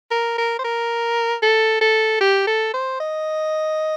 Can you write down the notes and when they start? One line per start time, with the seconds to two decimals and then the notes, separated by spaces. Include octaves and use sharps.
0.11 A#4
0.38 A#4
0.59 C5
0.64 A#4
1.42 A4
1.81 A4
2.21 G4
2.47 A4
2.74 C5
3.00 D#5